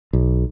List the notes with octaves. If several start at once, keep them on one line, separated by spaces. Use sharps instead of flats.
B1